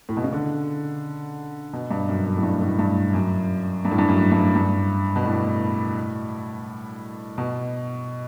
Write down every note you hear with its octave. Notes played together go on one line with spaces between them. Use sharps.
A2
B2
C#3
D3
B2
G2
F#2
F#2
A2
G2
A2
G2
F#2
G2
A2
G2
F#2
G2
G2
B2
A2
B2